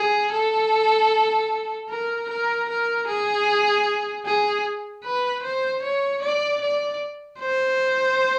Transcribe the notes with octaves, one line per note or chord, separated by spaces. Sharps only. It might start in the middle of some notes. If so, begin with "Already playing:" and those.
Already playing: G#4
A4
A#4
A#4
A#4
G#4
G#4
B4
C5
C#5
D5
D5
C5